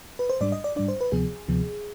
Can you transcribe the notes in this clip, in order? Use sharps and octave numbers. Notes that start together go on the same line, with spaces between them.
B4
C5
G#2 G3 D4 D5
D#5
D5
G#2 G3 D4 D5
C5
B4
D2 C3 F3 B3 G#4
D2 C3 F3 B3